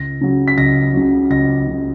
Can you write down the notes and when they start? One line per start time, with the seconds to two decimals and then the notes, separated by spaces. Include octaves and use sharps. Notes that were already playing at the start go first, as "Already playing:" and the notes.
Already playing: C#2 A#6
0.21 C#3 F#3
0.48 B6
0.58 C#2 A#6
0.94 C#3 F#3
1.30 C#2 A#6
1.67 C#3 F#3